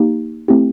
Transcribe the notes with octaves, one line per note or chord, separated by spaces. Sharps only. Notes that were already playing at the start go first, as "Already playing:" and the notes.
Already playing: A#3 D#4 G4
A3 C4 E4 G4